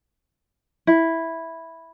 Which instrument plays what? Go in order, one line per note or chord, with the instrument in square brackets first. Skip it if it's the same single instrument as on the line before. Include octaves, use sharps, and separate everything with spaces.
[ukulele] E4